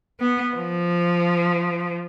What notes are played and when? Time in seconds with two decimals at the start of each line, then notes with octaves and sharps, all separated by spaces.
0.20 B3
0.55 F3